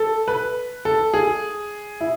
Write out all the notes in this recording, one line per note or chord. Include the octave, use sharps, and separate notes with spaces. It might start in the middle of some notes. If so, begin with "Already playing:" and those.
Already playing: A4
B4
A4
G#4
E4